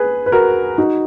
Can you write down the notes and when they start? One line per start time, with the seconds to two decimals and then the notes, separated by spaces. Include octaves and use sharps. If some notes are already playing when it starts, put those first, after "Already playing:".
Already playing: G#4 B4
0.26 B4
0.32 F#4 A#4
0.78 D#4 F#4